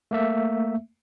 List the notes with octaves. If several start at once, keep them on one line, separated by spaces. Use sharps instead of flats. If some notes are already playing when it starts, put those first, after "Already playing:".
A3 A#3 E5